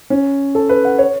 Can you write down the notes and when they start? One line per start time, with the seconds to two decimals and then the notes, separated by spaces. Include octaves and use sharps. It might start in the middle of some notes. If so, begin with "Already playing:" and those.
0.10 C#4
0.55 A4
0.69 B4
0.85 F#5
0.99 C#5